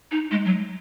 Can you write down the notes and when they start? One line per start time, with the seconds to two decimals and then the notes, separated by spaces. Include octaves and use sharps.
0.11 D#4
0.31 G#3
0.45 F#3